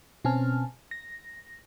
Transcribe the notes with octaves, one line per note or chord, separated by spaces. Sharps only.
B2 C4 C#4 G#5 A5 F6
A#6